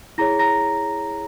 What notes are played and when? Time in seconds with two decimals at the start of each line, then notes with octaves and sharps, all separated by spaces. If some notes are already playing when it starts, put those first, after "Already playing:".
0.18 E4 G#4 C#5 A#5 A#6
0.39 A#5 A#6